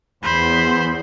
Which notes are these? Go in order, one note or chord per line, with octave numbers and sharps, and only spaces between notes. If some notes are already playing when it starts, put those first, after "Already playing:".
E2 C5 B5